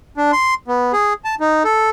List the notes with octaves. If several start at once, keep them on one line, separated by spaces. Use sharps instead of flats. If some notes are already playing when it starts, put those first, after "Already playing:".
D4
C6
B3
G#4
A5
D#4
A4